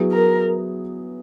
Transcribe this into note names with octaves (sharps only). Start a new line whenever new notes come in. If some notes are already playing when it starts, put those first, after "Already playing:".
Already playing: F#3 B3 E4 G#4
A#4